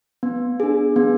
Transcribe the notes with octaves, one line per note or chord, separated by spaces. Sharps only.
B3
D4 G#4
B3